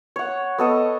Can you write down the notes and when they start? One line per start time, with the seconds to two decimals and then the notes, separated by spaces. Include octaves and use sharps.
0.16 C#5 F#5
0.58 B3 A4 D#5 C#6